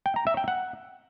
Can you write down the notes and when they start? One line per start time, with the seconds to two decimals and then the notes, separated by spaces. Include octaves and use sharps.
0.06 G5
0.16 A#5
0.27 E5
0.37 G5
0.48 F#5